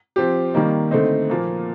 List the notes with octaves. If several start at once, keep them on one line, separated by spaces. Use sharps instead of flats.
F3 C4 G4
D#3 G3 A#3 D#4
D3 A3 C4 D#4
A#2 F3 A#3